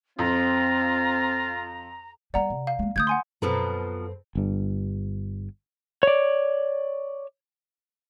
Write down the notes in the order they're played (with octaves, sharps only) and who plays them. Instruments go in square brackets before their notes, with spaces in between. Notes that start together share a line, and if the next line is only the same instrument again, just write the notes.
[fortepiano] F2 [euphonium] C4 [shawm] F4 [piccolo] A#5
[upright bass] G3 B3 [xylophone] D5 F#5 A#5
[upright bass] C3
[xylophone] F5
[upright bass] G#3 A#3
[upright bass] D3 A3 [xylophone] D#6 G6 G#6
[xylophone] F#5 G#5 C6
[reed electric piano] F#2 [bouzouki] B2 F3 A#5 [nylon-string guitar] C4 A4 B4
[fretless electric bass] G1 G2
[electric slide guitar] C#5 D5